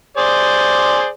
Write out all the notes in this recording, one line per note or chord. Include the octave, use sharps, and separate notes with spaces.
G#4 C5 D5